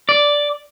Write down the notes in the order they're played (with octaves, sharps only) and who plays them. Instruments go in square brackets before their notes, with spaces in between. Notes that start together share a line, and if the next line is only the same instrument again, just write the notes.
[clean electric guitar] D5